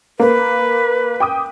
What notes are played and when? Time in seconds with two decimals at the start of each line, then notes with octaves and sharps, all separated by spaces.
0.20 A#3 B4
1.20 G5 D6 D#6